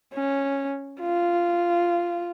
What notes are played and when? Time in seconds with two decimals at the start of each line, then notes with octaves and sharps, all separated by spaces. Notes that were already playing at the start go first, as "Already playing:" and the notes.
0.14 C#4
1.01 F4